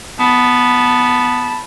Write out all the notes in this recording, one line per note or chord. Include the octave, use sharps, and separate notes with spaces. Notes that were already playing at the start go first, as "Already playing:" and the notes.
B3 A5 B5